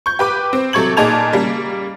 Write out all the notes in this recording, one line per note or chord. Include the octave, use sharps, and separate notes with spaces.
C#6 G6
G4 B4 D6
C4
C3 F#3 A4 C#6 G#6 F#7
A#2 D#4 G#4 A5 G#6 F7
C#3 G3 A#3